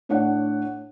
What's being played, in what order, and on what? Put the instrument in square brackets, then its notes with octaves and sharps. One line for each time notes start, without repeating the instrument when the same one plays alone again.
[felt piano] A2 D4 C#5 F#5